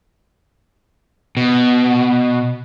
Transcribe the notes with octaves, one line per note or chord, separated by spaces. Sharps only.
B2